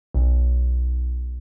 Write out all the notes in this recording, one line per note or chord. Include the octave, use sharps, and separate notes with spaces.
B1